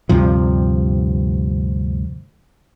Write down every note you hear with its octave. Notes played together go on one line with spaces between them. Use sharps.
D2 G2 C3 F3